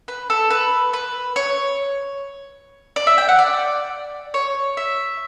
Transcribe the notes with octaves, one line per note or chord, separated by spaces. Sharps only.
B4
A4
B4
B4
C#5
D5
E5
G5
F#5
D5
C#5
E5